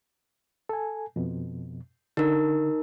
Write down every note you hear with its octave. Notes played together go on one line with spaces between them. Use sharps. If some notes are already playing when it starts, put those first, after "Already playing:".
A4 G#5
F2 B2
D3 D#4 A#4